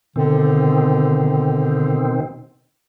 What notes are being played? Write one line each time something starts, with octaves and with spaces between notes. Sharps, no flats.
B2 D3 D#3 C4